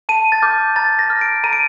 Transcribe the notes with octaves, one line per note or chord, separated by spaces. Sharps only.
A5 D#7
A6
D6 F6 G6
A#5 A6
A#6
F6
D7
A#5 D#7
D7